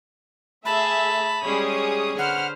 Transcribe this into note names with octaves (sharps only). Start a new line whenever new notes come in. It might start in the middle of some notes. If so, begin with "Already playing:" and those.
A3 G#4 E5 A5 B5
G3 G#3 C#4 G#4 C#5 G#5 D#6
D3 B4 C5 F#5 F6